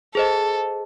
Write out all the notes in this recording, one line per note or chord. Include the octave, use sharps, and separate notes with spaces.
G#4 A4 C5 D#5